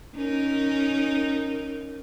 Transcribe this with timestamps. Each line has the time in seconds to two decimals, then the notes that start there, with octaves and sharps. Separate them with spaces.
0.16 C#4 D#4 A#4